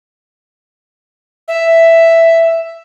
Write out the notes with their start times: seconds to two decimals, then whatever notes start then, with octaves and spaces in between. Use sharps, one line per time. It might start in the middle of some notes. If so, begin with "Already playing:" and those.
1.48 E5